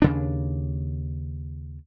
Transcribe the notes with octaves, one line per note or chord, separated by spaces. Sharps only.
D#2 C#3 D4